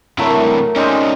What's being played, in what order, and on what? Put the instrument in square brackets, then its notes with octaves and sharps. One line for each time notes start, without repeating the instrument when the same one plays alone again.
[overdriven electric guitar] C3 E3 [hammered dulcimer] F#3 A3 A#4
[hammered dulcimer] G#3 C4 G4 [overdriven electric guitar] C#4 D#4